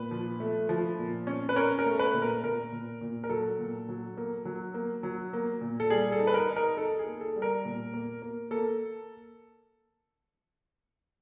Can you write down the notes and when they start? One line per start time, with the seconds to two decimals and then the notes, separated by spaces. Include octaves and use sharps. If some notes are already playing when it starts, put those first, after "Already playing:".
Already playing: A#2 B4
0.11 F3
0.40 A3
0.69 F3
0.99 A#2
1.27 C#4
1.49 B4
1.56 C#4 A#4
1.79 A#4
1.86 A3
1.99 B4
2.14 A#2
2.22 A#4
2.44 A#2 A#4
2.72 A#2
3.01 A#2
3.24 A#4
3.30 F#3 A4
3.59 A#2
3.89 F#3
4.17 A#3
4.45 F#3
4.74 A#3
5.03 F#3
5.33 A#3
5.61 A#2
5.80 A4
5.90 G3 G#4
6.12 A4
6.19 D#4
6.27 B4
6.34 A#4
6.49 D#4
6.56 A#4
6.77 D#4 A4
6.99 G#4
7.06 A#3
7.21 A4
7.36 G3
7.42 A#4
7.65 A#2
7.94 A#3
8.22 A#3
8.51 A#3 A4